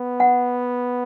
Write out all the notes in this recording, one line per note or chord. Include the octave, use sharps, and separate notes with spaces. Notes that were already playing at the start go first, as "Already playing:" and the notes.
Already playing: B3
F#5